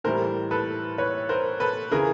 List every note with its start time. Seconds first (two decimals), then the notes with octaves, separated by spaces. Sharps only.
0.04 A2 E3 G3 A#4 C5
0.51 A4 B4
0.98 B4 C#5
1.29 A#4 C5
1.60 A4 B4
1.91 C#3 E3 G#4 A#4